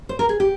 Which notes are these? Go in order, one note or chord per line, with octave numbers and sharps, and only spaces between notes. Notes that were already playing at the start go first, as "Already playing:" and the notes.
C5
A#4
G#4
G4